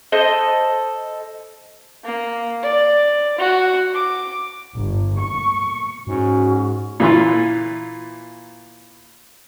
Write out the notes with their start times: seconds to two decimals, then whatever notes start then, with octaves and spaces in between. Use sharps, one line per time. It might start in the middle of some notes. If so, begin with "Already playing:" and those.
0.12 A4 C5 D#5
2.05 A#3
2.63 D5
3.38 F#4
3.94 D6
4.77 G1
5.20 C#6
6.07 G#2 C#4 F#4
7.00 A#2 E3 F4